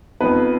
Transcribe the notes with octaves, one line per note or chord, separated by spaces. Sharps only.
F2 F3 B3 D#4 B4